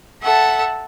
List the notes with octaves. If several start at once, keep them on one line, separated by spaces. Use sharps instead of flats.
A4 E5 F#5 A5